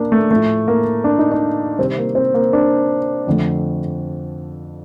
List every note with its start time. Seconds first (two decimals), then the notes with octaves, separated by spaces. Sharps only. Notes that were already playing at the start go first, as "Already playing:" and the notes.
Already playing: A#2 A#3 D4
0.12 A3
0.31 A2 F3 A3
0.68 A#3
1.04 D4
1.19 D#4
1.32 D4
1.78 C3 D#3 G3 C4
1.98 A#3
2.15 C4
2.34 A#3
2.53 D4
3.27 F2 D3 A3